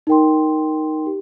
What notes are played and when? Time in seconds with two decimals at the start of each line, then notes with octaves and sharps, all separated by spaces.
0.07 D#4 A#4 G5 C6
1.06 G4